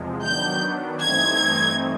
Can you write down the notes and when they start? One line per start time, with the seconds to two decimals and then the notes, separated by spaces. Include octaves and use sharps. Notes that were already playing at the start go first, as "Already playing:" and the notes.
Already playing: E2 C3 F3 G#3
0.24 D#3 F#3 B3 D4 G6
1.00 G2 E3 A3 C4 D#4 G#6